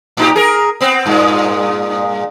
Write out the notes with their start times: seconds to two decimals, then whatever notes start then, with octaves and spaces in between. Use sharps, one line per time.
0.17 A2 D#4 G4
0.36 G#4 A#4
0.81 B3 C4
1.06 G2 A#2 G#3